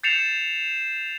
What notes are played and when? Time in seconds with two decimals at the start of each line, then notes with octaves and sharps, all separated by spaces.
0.03 G6 A6 C7 C#7 E7 F7